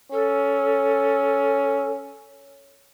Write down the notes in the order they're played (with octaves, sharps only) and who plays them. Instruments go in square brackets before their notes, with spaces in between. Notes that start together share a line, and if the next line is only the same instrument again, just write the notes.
[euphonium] C#4 [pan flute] A4